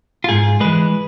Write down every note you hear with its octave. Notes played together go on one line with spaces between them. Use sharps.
F4
G#2 G#4
E3 G#3 B4